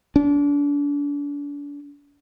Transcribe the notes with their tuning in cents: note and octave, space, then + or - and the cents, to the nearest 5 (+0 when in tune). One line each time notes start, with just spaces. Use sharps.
D4 -35